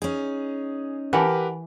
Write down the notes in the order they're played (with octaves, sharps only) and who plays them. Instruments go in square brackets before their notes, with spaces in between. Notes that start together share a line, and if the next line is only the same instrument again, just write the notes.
[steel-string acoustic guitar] C#4 D#4 [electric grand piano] G#4
[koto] E3 [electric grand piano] G4 A#4 B4 [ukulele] F#5 A5 B5